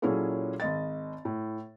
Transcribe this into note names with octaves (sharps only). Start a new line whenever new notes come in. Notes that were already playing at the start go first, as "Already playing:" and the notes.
A#2 F#3 C#4 E4 G#4 A4
G#1 D#5 A6
A2